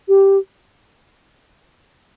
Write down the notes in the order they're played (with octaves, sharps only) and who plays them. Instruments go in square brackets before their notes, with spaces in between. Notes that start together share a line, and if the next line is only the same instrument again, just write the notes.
[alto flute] G4